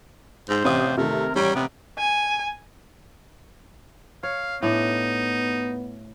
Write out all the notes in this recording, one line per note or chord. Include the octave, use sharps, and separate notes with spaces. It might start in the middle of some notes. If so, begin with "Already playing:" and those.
G#2 C5
A1 C3 F5 D#6
C3 D#3 A3 A#4
A1 G3 C#5 A#5 D7
C3 B3
G#5
C#5 F5
A2 B3 D4 D#4